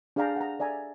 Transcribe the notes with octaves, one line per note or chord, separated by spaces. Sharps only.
D4 G#4 D5 F5 G5 A#5
F#5 A#5
A4 D5 E5 G#5 A#5